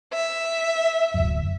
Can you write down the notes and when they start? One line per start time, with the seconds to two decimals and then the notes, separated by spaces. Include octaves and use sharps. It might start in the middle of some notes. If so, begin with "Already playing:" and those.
0.13 E5
1.14 D1 F#2